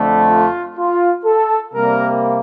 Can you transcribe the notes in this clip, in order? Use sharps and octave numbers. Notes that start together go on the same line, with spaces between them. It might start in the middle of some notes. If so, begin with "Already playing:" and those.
Already playing: F2 D3 A3
F4
F4
A4
C3 G3 A#3 A#4